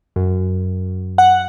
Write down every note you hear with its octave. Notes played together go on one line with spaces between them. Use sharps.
F#2
F#5